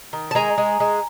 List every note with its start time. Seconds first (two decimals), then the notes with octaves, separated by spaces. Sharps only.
0.13 D#3
0.31 A5
0.35 G#3 G#5 A#5
0.58 G#3
0.80 G#3